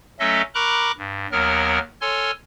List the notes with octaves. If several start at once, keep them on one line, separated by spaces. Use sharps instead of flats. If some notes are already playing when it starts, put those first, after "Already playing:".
F#3 A3 C#4 A4 D#5 E5
A#4 A#5 B5 C#6 D6 F#6
G2
D#2 F#3 B3 A#4 F6
A4 C#5 G#5 C6 F6